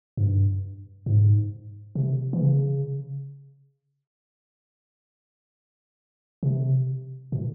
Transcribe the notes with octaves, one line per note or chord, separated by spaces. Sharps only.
G2
G#2
C3
E3
C#3
C3
A#2